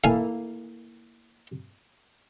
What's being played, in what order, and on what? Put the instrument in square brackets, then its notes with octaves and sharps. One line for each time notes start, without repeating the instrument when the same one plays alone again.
[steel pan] A#3 E4 A4 [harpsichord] F5 G#5